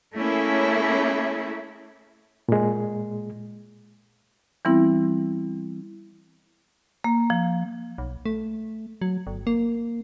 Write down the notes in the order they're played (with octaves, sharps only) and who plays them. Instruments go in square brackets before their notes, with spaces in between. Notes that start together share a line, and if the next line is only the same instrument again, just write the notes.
[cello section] A3 A#3 C#4 E4 G#4
[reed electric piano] A#2 G#3
[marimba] E3 G3 B3 C4 E4
A#3
F3
[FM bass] B1
A3
F#3
G1
A#3